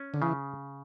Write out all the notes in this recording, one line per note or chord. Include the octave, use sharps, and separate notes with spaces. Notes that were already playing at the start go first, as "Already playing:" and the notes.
Already playing: C#4
D3
C#3 E3